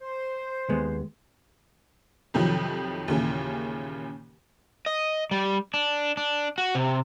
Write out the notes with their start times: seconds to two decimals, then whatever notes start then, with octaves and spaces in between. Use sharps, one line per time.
0.01 C5
0.69 D#2 G#3 B3
2.34 F2 C3 D#3 F3 F#3
3.08 D#2 A#2 C#3 E3
4.86 D#5
5.31 G3
5.74 D4
6.17 D4
6.58 F#4
6.75 C3